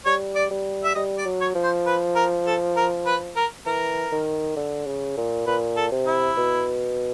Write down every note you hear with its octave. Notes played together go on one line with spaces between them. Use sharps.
G3 C#5
D5
G3
E5
G3 D#5
D5
F#3
C#5
F3
C5
B4
A#4
A4
A#4
B4
A#4
E3 A#4
D#3
D3
C#3
A#2
A#2 B4
A4
C3
E4
B2